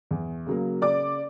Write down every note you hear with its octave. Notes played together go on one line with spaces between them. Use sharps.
E2
C#3 F#3 A#3
C#3 D5 D6